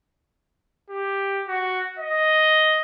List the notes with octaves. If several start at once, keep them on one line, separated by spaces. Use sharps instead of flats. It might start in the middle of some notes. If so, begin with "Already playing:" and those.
G4
F#4
D#5